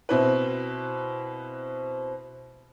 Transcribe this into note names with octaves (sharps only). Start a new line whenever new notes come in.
B2 C4 E4 B4